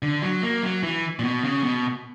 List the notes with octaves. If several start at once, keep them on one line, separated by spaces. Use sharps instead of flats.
D3
F#3
A#3
F#3
E3
A#2
B2
C#3
B2